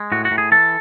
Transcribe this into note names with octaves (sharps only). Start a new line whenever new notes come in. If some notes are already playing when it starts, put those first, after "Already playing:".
Already playing: G#3
A2 F#4
F#4
A2
G#4
E3 A4